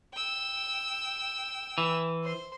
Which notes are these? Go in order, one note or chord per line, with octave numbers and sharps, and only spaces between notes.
G5 E6
E3
C5 C6